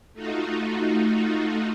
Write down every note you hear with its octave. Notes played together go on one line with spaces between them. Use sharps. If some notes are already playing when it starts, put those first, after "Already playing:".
A3 D#4 F4 F#4